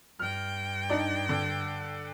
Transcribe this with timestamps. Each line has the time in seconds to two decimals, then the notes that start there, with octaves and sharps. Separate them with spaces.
0.19 G2 G5 F6
0.90 D4 D#4 D5
1.29 D3